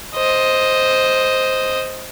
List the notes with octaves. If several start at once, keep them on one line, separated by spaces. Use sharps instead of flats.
C5 D#5